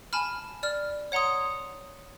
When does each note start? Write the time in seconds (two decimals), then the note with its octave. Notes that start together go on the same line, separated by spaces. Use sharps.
0.13 G#5 A5 B5 F6
0.63 D5 F6
1.12 C#5 F#5 A#5 C6 D#6